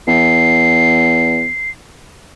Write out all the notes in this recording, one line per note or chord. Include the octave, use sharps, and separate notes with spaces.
E2 C7